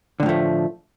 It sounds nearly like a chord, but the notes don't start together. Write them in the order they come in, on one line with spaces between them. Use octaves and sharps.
D3 A2 F3 A3